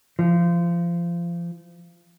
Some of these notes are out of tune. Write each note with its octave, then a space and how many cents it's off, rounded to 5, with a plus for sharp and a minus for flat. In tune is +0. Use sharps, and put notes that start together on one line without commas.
F3 -25